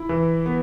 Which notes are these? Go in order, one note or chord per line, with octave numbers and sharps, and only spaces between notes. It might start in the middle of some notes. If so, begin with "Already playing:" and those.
Already playing: E4
E3
B3